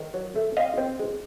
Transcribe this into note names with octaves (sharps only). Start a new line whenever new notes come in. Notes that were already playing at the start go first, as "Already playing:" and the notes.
Already playing: D#3
F#3
A3
C4 D#5 F5
C4
G#3